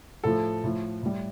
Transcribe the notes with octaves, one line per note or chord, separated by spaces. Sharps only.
A2 F3 A4
A2 F3
A2 G3